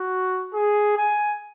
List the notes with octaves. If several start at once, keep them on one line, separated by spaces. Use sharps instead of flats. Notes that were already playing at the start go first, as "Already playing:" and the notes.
Already playing: F#4
G#4
G#5